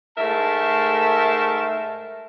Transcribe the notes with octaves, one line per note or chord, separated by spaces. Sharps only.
G#2 A3 A#4 E5 A5